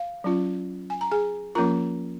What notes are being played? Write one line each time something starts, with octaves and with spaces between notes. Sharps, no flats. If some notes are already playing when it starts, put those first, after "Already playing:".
Already playing: F5
F#3 C#4 F4
G#5
A#5
G#4 G#5
F3 A#3 C#4 F4 A#4 A#5